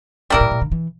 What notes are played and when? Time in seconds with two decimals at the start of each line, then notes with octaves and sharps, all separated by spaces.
0.30 A#2 G3 A#3 E4 A#4
0.41 A2
0.51 A#2
0.61 D3
0.72 E3